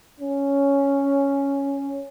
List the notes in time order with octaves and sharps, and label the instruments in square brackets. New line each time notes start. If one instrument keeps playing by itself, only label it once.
[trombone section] C#4